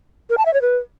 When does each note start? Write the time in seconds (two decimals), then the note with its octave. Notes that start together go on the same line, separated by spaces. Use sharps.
0.30 A#4
0.38 A5
0.46 E5
0.54 C#5
0.62 B4